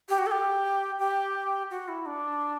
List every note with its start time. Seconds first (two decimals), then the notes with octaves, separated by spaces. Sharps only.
0.09 G4
0.19 F#4
0.26 A4
0.31 G4
0.99 G4
1.71 F#4
1.88 E4
2.06 D4